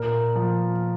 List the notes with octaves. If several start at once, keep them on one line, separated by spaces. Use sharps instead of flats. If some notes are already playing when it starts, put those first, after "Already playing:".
Already playing: A#2 A#4
F3